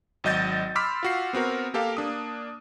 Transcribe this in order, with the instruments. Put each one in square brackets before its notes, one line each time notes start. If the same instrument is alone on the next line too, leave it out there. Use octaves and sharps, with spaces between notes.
[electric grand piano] G#1 F#3 D#5 G6 A6
B5 C6 D6 E6 F6 B6
F4 F#4 C7
B3 C4 F#4 A#4
A#3 G4 A4 A#4 F5
A#3 D4 D#6